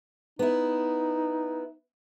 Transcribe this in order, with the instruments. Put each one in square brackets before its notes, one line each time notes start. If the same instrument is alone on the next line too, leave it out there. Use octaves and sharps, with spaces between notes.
[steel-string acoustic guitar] B3 E4 [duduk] D#4